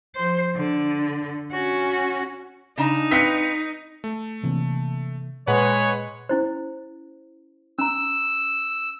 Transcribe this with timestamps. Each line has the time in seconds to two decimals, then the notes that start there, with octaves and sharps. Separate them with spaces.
0.15 F3 C5
0.56 D3
1.52 C#4 F#4
2.78 C#3 D4 D#4 A#5
3.11 C4 B4 F5 B6 C#7
4.04 A3
4.43 C3 E3 A#3
5.48 A#2 G#3 B4 C#5 F#5 B5
6.29 C#4 E4 C5
7.79 C#4 A#5 E6